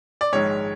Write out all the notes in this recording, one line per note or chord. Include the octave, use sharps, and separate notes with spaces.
D5
A#1 G#2 D#3 G#3 C#5